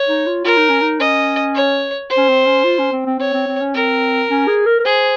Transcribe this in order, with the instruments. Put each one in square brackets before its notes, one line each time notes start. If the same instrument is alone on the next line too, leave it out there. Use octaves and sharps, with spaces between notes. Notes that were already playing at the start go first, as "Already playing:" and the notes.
Already playing: [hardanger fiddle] C#5
[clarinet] D#4
F4
[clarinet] F4 [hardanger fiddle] A#4
[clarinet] D#4
C#4
D#4
[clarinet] C#4 [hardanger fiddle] D#5
[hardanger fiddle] C#5
C5
[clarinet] C#4
C4
C#4
F4
C#4
C4
C4
[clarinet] C4 [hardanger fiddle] C#5
[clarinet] C4
C4
C#4
[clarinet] C4 [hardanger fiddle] A#4
[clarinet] C#4
G#4
A#4
A#4
[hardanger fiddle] G#4 [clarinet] C5